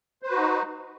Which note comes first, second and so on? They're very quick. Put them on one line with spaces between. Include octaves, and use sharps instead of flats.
C5 B4 F#4 D#4